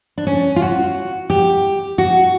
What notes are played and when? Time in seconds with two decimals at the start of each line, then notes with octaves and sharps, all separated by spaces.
0.18 D4
0.27 C#4
0.56 F4
0.62 F#4
1.30 G4
1.98 F#4